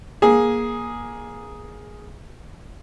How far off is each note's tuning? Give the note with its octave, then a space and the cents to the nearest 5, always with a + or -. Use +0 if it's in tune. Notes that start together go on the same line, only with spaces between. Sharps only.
A#3 +20 G#4 +0